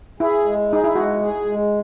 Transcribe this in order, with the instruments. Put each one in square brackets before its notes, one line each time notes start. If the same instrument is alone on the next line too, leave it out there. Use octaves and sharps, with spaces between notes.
[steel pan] E4 [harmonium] G#4
[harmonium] G#3
[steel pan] D#4 [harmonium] G#4
[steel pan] E4
[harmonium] G#3 [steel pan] F#4
[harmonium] G#4
G#3